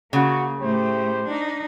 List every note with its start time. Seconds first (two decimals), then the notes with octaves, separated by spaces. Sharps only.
0.13 C#3 A#3 F#4
0.59 A2 A3 G4 C5
1.27 D4 D#4